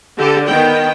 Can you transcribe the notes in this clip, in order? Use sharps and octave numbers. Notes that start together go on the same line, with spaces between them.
D3 G4 A4
D#3 B3 G5